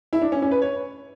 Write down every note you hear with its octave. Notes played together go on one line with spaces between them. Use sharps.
E4
D4
C#4
C#4
B4
C#5